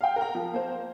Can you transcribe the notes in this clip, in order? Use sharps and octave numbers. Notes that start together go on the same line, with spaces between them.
F5 G5
A#4 A#5
F3
A#3 C5